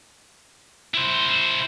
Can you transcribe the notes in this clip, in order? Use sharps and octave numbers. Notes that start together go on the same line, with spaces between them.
E4 C5